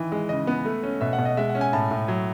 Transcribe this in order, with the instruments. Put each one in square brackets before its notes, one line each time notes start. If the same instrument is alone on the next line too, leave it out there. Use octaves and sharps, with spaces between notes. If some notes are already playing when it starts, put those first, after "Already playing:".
Already playing: [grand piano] D#3 E3
G#3
C#3 D#5
B3
A3
C#4
B2 E5
F#5
B2
D#5
G#3 E5
F#5
C#4
G#5
A2 A5
A2
F#3